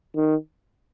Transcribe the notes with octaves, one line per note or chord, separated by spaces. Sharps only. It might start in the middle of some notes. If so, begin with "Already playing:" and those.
D#3